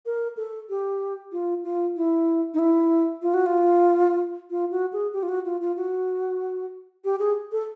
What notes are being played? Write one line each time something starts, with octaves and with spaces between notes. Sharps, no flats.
A#4
A4
G4
F4
F4
E4
D#4
E4
F4
F#4
F4
F4
F#4
G#4
G4
F4
F#4
F4
F4
F#4
G4
G#4
A4